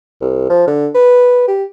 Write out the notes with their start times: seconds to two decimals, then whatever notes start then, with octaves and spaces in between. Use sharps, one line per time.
0.21 C2
0.50 F3
0.67 D3
0.95 B4
1.48 G4